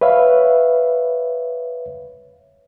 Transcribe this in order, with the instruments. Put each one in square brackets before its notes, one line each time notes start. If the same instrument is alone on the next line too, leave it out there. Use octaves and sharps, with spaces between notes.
[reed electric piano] B4 C#5 E5 F5